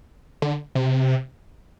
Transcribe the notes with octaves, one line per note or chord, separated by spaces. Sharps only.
D3
C3